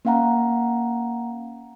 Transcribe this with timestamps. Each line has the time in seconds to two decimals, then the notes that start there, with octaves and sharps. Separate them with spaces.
0.05 A#3 C#4 F5 F#5 A#5